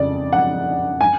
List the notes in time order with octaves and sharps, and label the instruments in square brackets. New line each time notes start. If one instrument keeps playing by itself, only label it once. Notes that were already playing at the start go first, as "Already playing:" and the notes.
Already playing: [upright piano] F2 C#3 D5
F#5
G#5